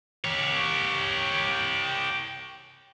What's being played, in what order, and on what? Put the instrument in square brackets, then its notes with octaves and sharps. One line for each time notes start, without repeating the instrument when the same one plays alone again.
[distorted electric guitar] G4 C#5